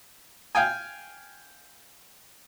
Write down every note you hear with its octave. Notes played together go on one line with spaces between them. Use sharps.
F5 G5 G#5